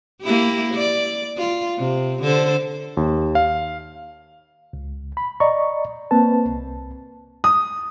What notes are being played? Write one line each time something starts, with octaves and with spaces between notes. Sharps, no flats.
A#3 E4 G4
D5
F4
C3
D3 A4 C5
D#2
F5
C#2
B5
D5 D#5 A#5 C#6
A#3 C4 B4 A5
C2
D#6